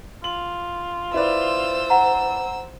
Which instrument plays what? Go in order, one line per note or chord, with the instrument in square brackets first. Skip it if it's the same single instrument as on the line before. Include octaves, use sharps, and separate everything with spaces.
[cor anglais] F4 [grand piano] F#7
[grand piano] E4 B4 D5 [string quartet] C5 E6
[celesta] F#5 A#5